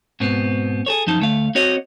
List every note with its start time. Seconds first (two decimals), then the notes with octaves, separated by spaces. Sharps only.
0.20 G#2 B2 B3 C4
0.86 G#4 A4 C#5
1.07 F#2 F3 D#4 A5
1.19 D2 A3 F5
1.55 C4 F#4 C#5 D#5